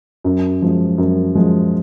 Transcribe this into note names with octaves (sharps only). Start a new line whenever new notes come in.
F#2
F3 G#3
F#2
F3 G#3